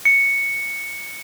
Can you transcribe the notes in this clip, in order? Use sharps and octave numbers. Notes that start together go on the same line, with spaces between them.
C#7